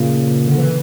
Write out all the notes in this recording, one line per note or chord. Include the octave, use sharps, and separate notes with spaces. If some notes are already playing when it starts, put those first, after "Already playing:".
Already playing: A#2 C#3
D3
E3